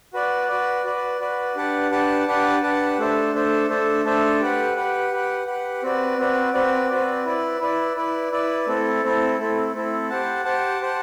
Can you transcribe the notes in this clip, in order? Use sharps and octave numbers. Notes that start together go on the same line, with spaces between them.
F#4 B4 D5
F#4 B4 D5
F#4 B4 D5
F#4 B4 D5
D4 G4 B4 F#5 A5
D4 G4 B4 F#5 A5
D4 G4 B4 F#5 A5
D4 G4 B4 F#5 A5
A3 D4 A4 C5 E5
A3 D4 A4 C5 E5
A3 D4 A4 C5 E5
A3 D4 A4 C5 E5
G4 B4 F#5
G4 B4 F#5
G4 B4 F#5
G4 B4 F#5
C4 F#4 B4 D5
C4 F#4 B4 D5
C4 F#4 B4 D5
C4 F#4 B4 D5
E4 B4 D5
E4 B4 D5
E4 B4 D5
E4 B4 D5
A3 C4 E4 A4
A3 C4 E4 A4
A3 C4 E4 A4
A3 C4 E4 A4
G4 C5 F#5 A5
G4 C5 F#5 A5
G4 C5 F#5 A5